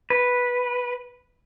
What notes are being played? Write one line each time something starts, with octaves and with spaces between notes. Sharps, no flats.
B4